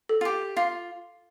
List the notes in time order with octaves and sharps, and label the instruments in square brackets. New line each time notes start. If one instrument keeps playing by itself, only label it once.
[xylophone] A4
[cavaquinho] F4
G4
[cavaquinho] F4 [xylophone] F5